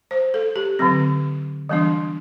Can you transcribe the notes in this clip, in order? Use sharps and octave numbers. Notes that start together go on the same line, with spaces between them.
C5
A4
G4
D3 F#3 C4
E3 G3 B3 D4